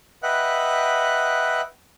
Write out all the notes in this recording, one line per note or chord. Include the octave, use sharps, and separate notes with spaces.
B4 D#5 E5 F#5 G5 F#6